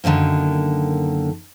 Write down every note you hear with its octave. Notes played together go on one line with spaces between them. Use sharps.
F#2 D3 D#3 G#3 A#3